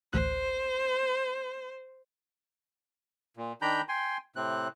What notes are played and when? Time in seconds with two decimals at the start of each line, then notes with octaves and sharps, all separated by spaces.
0.13 A1 D2 C5 F#6
3.37 A#2
3.62 D#3 D4 G5 A#5 B5 G6
3.89 G5 G#5 C6
4.36 A2 C3 C4 F#6